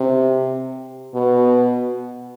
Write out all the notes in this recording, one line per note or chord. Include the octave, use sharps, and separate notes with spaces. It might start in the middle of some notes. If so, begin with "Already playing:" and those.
Already playing: C3
B2